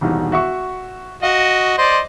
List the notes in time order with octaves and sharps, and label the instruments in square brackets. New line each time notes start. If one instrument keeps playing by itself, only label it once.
[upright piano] E1 C2 D#3
F#4 E5 C#6
[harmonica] F#4 D#5 [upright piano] F5
[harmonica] C5 D5 D#5